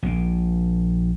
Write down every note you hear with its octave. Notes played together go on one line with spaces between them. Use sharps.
A#1 A#2